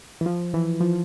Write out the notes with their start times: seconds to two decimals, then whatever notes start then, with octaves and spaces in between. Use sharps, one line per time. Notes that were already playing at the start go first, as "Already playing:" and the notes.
0.21 E3
0.26 F3
0.54 E3
0.80 F3